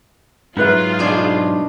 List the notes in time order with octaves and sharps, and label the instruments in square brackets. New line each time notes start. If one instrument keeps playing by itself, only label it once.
[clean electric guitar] G#2 F#3 [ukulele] D#4 B4 E5 [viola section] F4 G#4
[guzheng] B2 D4 C5